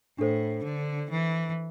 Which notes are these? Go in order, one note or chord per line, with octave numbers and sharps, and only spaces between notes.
A2 D4 A4 C5
D3
E3